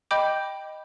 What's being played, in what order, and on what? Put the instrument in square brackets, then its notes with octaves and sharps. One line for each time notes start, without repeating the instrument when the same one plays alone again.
[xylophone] D#5 G5 B5 D6 G6